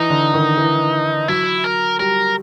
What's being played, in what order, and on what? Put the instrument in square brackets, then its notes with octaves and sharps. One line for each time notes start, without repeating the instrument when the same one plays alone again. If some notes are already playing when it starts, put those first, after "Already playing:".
Already playing: [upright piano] E3 [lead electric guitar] D#4
[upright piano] D3
D#3
E3
[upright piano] F#3 [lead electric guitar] E4
[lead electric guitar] A#4
[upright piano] G3 [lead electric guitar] A#4